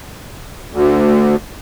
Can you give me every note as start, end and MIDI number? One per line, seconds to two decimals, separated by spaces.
0.72 1.36 38